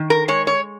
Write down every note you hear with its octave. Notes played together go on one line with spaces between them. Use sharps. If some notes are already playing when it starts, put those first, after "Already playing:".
Already playing: D#3
A#4
G#3 C#5
C#5